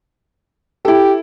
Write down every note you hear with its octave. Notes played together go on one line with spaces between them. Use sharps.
E4 G4 A4